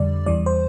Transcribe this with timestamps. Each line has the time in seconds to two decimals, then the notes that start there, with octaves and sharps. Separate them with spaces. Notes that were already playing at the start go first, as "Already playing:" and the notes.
Already playing: F2 D3 G3 D5
0.26 E2 E3 G3 D5
0.46 C5